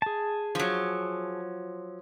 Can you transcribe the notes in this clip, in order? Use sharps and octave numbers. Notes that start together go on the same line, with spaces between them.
G#4 A5
F3 F#3